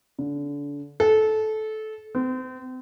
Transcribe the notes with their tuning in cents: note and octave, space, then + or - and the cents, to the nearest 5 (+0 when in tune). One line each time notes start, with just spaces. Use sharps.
D3 -30
A4 -20
C4 -35